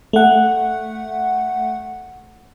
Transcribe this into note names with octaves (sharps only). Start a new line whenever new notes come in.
A3 F#5